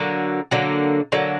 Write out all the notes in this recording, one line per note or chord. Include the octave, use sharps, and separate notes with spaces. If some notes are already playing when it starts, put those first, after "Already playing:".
Already playing: D3 F#3 A#3
D3 F#3 A#3
D3 F#3 A#3